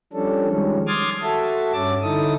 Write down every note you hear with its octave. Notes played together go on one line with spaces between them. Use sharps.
F3 G3 C#4 D4 A4
D#3 F3 G3 G#3 C#4
C6 D6 D#6 F6 G#6 A6
F#4 A4 E5 A5
G2 C#4 D6 A6
D3 D#4 E4 A4 D#6